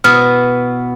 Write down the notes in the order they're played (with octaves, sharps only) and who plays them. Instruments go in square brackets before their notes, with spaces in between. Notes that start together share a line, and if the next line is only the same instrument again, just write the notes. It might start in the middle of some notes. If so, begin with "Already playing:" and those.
[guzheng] B2 B3 E4 [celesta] F6